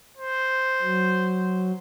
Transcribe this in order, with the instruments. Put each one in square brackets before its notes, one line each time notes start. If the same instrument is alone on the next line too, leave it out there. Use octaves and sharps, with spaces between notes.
[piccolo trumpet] C5
[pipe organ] F#3